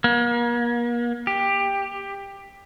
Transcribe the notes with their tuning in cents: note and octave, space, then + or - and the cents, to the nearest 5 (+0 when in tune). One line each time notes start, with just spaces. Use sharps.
A#3 +40
G4 +15